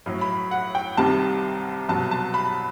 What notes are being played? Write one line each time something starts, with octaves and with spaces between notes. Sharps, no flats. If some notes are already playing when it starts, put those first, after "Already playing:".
A2 F#3
B5
F#5
G5
C2 C3 D#3 G3 A5
C2 B2 F#3 A5
A5
B5